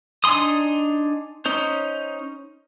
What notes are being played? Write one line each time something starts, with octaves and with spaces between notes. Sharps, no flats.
D4 D#4 G#5 C6 D#6
C#4 D#4 C5